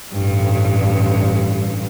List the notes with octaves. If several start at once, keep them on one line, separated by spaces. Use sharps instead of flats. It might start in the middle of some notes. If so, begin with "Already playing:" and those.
A1 G2